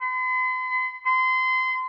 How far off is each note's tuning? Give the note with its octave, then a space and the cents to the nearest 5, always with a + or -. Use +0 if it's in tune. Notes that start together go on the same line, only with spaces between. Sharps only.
C6 -45
C6 -25